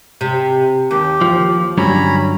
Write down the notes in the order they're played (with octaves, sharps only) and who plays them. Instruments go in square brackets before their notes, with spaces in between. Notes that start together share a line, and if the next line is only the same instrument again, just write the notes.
[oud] C3
[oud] D#2 [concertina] G4
[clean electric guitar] F3
[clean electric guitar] G2 D3 F#3 [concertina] C#4 A#5 B5